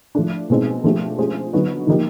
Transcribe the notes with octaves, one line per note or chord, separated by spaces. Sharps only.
F3 A3 D4
B2 G#3 C4 D#4
F3 A3 D4 G4
G#3 C#4 F4 G#4 C5
D3 F#3 B3 D#4 F#4
D3 F3 A#3 D#4 G4